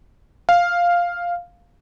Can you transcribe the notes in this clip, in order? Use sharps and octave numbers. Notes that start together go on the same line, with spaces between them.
F5